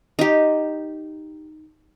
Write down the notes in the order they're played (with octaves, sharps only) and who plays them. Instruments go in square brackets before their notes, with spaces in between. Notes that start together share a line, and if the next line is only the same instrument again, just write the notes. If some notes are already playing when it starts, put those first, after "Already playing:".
[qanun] D#4 G4